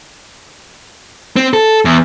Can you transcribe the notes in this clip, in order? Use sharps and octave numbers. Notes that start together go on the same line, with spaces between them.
C4
A4
E2